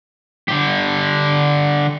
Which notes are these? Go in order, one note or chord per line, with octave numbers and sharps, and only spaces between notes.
D3 G4